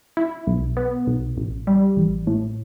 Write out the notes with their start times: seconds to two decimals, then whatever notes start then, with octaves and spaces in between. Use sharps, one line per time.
0.17 E4
0.47 B1
0.77 B3
1.07 B1
1.38 A1
1.67 G3
1.97 A1
2.27 A2